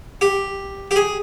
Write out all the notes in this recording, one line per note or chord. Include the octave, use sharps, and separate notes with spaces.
G4
G4
G#4